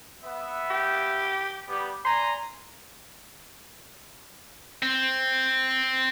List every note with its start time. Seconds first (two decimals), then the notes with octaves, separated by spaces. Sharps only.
0.23 B3 E5
0.71 G4
1.69 G3 B3 G4
2.05 D5 G#5 A#5 C6
4.83 C4